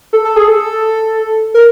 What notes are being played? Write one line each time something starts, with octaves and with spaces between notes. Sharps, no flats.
A4
A4
G#4
A4
A#4